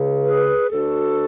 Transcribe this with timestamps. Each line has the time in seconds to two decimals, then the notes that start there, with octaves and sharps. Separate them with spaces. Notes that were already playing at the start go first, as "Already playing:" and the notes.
Already playing: C#2 C#3
0.24 G#4 B4
0.71 D2 D3 F#4 A4